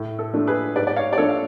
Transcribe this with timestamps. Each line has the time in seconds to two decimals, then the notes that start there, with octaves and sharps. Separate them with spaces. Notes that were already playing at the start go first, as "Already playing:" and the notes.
Already playing: A2
0.19 A4
0.34 F3 A3 D4
0.47 G#4 B4
0.75 G#2 B4 D5
0.87 D5
0.96 C#5 F5
1.13 D5
1.18 F3 A3 D4 A4 C#5
1.29 F5